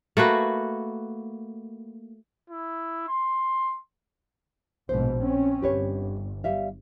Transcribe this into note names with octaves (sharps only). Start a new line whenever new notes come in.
A3 A#3 F#4 B4
E4
C6
A#1 G#2 B2 B4 C5
C4 C#4
G1 G4 B4 C#5
G3 E5 F5